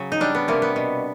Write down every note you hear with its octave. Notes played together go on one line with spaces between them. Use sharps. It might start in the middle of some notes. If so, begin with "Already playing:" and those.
Already playing: C#3 F#3
D#4
G3 D4
B3
C3 A#3
B3
B2